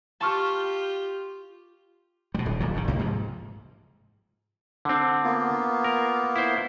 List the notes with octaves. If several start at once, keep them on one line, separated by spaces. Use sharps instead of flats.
F4 G4 A5 C#6 F6
B2 G3
D#1
D1 A#2 F#3
G1 G#2 D#3
C2 A#3
G#2 C3 F3
D3 C4
A#3 B3 F4
A#4
E4 C5